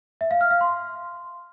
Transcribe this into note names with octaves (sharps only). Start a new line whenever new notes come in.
E5
F5
F6
F5
C6